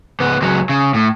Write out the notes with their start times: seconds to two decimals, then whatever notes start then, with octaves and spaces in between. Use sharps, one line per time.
0.20 C#2 B3
0.42 C#2 F#3
0.69 C#3
0.94 A2